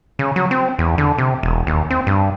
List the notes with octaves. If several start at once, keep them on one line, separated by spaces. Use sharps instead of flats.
C#3
F#3
C4
E2
D3
C3
E1
D#2
C4
G2